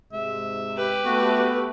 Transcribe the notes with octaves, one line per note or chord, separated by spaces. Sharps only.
G#2 C3 G#3 E5
G4 B4
A3 B3 F#4